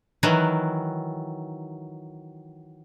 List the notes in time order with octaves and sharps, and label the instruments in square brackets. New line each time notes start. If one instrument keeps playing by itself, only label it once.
[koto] D#3 E3 F#3